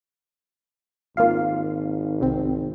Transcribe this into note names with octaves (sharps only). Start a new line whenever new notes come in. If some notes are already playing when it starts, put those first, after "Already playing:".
G#1 A#3 F4 F5
C2 C4